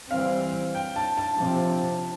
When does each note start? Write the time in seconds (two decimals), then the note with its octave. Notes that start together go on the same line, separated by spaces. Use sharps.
0.10 E3 G3 C4 F5
0.75 G5
0.96 A5
1.18 A5
1.39 C3 F3 C4